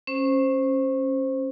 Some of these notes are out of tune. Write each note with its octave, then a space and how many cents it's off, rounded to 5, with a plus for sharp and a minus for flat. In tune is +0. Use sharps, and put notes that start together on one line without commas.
C#4 -20 C5 +0